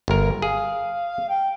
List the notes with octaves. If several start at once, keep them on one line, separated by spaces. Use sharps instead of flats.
G1 A#4
G#4 F5
G5